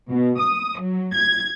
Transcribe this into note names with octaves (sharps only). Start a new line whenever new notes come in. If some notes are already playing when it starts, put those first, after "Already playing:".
B2
D#6
F#3
G#6